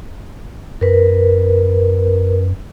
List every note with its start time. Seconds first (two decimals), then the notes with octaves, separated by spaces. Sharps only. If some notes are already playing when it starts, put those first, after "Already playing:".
0.81 F#2 A#4 B4